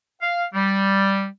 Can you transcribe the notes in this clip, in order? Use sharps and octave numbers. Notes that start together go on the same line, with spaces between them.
F5
G3